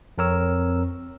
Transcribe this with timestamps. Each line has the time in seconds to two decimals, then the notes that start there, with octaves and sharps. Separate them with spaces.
0.18 F2 C4 A#4 C#5 E6